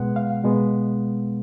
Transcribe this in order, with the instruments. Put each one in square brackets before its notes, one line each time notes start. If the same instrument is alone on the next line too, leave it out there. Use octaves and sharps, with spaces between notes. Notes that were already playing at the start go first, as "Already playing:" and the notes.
Already playing: [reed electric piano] B2 G#3 B3 F#5
F5
B2 G#3 B3